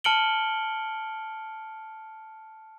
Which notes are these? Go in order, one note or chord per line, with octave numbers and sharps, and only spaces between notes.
A5 F6 C#7 D7 F#7 G7